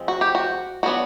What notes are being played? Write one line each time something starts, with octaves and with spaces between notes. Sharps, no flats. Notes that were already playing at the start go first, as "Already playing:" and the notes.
Already playing: F3 G#3 C4
F#4
G4
F#4
F#3 B3 D4 F#4